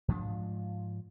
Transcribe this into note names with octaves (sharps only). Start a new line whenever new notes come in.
G#2 F3 D4